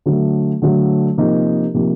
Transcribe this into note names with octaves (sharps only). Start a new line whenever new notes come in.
D3 F#3 A3
D3 F#3 A3
C3 F3 A#3 D#4 G4
C3 F3 A#3 D#4 G4